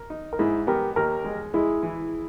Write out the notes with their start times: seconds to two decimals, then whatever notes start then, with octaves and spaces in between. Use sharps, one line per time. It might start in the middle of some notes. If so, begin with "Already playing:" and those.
Already playing: A#4
0.10 D#4
0.33 A#4
0.39 G#2 E4 G#4
0.67 B3 G4 A#4
0.96 D#2 G4 A#4
1.24 G#3
1.54 G#3 E4 G#4
1.83 E3